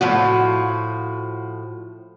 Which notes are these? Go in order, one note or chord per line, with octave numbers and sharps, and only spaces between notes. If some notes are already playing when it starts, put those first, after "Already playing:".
A2 F3 F#4